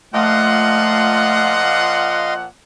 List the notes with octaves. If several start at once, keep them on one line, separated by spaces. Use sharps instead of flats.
A#2 F3 A3 D#5 F5 F#5 C6